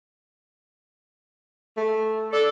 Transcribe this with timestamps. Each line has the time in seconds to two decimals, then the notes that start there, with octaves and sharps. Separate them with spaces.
1.77 A3
2.33 A4 D5